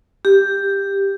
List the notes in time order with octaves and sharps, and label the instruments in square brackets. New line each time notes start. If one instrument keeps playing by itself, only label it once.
[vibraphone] G4